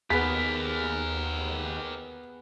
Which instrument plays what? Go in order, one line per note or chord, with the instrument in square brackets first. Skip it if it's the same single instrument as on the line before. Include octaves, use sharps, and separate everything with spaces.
[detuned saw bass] D#2 [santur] B3 G#4 [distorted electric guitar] G4 A#4 [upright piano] B6